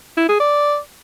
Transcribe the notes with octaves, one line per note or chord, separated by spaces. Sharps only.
E4
G#4
D5